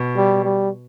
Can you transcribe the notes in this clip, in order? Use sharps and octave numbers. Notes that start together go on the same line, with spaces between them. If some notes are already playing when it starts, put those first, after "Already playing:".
Already playing: B2
G3
G3